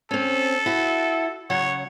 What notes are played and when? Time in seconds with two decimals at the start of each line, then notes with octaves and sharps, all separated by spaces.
0.11 C4 C#4 A4
0.66 E4 F#4
1.50 C#3 F#3 C#5 F#5